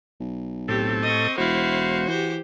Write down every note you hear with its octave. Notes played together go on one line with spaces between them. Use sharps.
B1
A2 C4 G4 A4
D#5 C#6
E1 E4 F#4 C5 F5
E3 G4 C5